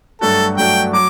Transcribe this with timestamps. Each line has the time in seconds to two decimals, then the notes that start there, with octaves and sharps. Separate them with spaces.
0.21 G2 F#3 A3 D4 F#4 A4
0.57 G2 F#3 A3 D4 F#4 G5
0.93 F#3 D6